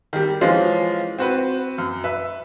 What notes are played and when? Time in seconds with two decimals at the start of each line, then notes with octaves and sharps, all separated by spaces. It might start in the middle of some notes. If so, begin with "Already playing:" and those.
0.13 D#3 G3
0.41 E3 F3 G#3 C#4 F4
1.18 C4 F#4 B4
1.78 F#2
2.04 B4 E5